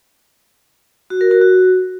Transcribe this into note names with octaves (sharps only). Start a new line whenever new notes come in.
F#4
A#4
F#4
F#4